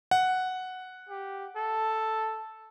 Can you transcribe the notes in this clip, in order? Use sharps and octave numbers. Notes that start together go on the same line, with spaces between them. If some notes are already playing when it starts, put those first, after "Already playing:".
F#5
G4
A4